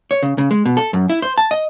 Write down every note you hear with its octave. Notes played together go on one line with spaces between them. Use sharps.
C#5
C#3
C#3
G#3
B2
A4
F#2
E4
C5
A5
D#5